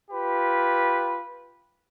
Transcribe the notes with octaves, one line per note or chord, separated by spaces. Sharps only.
F4 G4 B4